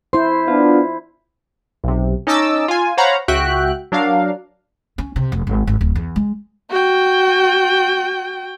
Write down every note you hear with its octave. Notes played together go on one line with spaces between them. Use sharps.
E4 C5 C6
B3 D4 F4
B1 C3
C#4 D#4 D#5 A5 D6 E6
F4 G#5
C5 C#5 F5 F#5 A#5 B5
C#2 F#4 E5 G5 F#6
F#3 D4 A#4 F5
C#4
C3
F1
G#1
G#1
D1
E2
G#3
F#4 G5